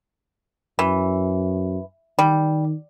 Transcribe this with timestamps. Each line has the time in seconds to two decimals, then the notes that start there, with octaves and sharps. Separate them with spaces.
0.79 F#2 E3
2.19 D#3 G3